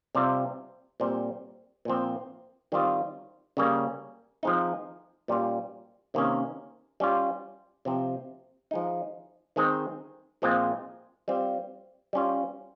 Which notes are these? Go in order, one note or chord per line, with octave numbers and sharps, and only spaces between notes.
C3 G3 C4 F4
A#2 G3 C4
A#2 F3 C4
D#3 G3 C4 F4
C#3 G3 A#3 C#4
F3 G#3 C4 D#4
A#2 G3 C#4 F4
C3 D#3 A#3 C#4
G3 C#4 F4
C3 F3 C4
F3 G#3 D#4
D#3 G#3 C4 D#4
A#2 F3 G#3 C4 F4
G3 C4 F4
G3 C#4 F4